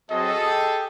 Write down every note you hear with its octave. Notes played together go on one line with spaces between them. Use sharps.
F#3 C4 F#4 G#4 A4 D#5
G4